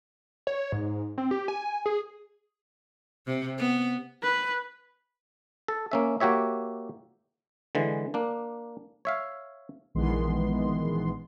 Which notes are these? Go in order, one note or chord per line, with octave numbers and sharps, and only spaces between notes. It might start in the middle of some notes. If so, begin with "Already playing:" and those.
C#5
G#2
C4
G4
G#5
G#4
C3
B3
B4
A4
A#3 C#4 E5
A#3 F#4 G4 C#5 E5
D3 E3 G#3
A#3 D4
C#5 E5 F5
A#1 D#3 E3 G#3 B3 C6